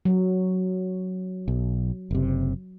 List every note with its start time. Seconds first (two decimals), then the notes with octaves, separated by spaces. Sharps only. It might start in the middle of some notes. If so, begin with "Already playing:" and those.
0.05 F#3
1.48 B1
2.11 F#1 C3